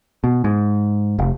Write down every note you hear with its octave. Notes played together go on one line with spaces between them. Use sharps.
B2
G#2
F1